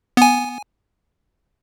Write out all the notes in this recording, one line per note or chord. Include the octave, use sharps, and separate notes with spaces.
B3 G#5